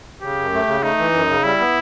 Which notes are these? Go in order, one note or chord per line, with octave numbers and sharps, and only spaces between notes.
C#3 G4
F#2
A3
C#3
A3 D#4
E3
F#2
C#3
G3 E4
B3